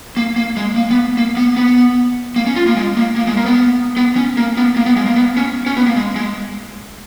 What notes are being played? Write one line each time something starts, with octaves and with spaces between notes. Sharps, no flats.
A#3
A#3
G#3
A#3
B3
A#3
B3
B3
A#3
C#4
F4
A#3
G#3
A#3
A#3
G#3
A#3
B3
B3
C#4
A#3
B3
A#3
B3
G#3
A#3
B3
C#4
C#4
B3
A#3
G#3
G#3